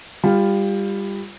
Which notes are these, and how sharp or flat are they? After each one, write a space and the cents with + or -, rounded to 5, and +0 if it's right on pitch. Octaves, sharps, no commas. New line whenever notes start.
G3 +20 F4 +0